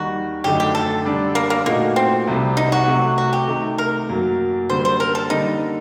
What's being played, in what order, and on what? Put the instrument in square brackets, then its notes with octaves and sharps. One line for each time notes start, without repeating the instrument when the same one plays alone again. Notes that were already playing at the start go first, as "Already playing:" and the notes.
Already playing: [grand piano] D#2 D#3 G3 [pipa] F#4
[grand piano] F#2 D3 A3 D#4 [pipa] G4
[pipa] G4
A4
[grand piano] D3 G3 D4
[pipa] A#3
A#3
[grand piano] A#2 A3 D#4 F#4 [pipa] A#3
[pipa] C4
[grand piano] C2 C3 G3
[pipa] D#4
F#4
[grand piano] C3 F#3 A3
[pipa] F#4
G4
[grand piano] C3 D#3 A3
[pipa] A#4
[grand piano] F#2 F#3 A#3 F#4
[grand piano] D3 G3 A#3 [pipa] C5
[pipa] C5
A#4
A4
[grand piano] D3 G3 A#3 [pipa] D#4